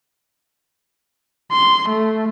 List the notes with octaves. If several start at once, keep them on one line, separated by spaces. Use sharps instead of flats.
C6
A3